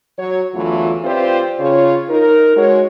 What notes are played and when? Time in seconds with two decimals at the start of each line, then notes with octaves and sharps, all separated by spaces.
0.18 F#3 C#5
0.54 E2 D3 E3 F#3 A3 F4
1.04 C4 F4 G4 B4 C5 D5
1.59 C#3 F4 C#5
2.09 D#4 A#4
2.57 G#3 F#4 C#5